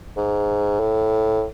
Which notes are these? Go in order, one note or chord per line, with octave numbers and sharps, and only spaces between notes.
G#2
A2